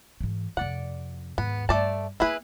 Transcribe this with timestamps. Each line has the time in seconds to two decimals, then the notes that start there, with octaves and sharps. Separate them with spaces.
0.20 G#2 E3
0.57 F2 C3 D5 F#5
1.38 D#2 G#2 B3
1.69 G2 A3 D5 A5
2.20 A#3 B3 E4 G#4 B4